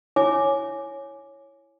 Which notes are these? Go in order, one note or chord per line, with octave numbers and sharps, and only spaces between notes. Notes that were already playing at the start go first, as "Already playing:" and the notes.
E4 C#5 E5 G#5 D6